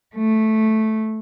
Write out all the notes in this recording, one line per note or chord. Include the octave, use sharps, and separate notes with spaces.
A3